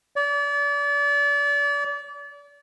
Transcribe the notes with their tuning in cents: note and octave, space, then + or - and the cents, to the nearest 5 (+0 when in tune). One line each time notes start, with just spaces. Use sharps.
D5 -35